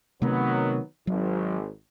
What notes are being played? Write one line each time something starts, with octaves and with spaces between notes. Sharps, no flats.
C3 D#3 F#3 A3 B3 C4
G#1 F#3